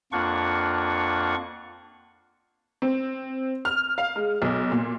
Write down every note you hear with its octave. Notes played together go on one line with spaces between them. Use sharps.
F2 A#3 D4 F4 F#5 C#6
C4
F6
F5
G#3
B1
A#2